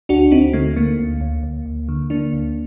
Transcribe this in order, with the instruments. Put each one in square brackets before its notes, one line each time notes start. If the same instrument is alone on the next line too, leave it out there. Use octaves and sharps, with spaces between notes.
[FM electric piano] D2 D4 F#4
D2 C4 D#4
D3 A3
D3 A#3
D2
D2
D2
D2
D3
D3 A#3 D4
D2